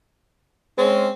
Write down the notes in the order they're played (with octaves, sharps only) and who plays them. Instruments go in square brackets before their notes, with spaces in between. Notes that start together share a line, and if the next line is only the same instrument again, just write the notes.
[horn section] G#3 C#4 [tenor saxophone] C4